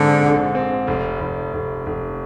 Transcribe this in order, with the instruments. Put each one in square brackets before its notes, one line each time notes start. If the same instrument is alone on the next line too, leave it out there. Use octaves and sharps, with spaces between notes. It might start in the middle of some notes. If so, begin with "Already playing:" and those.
Already playing: [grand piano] G#2 C4 [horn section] D3
[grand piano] A#1
C4
F1
F1
F1
F1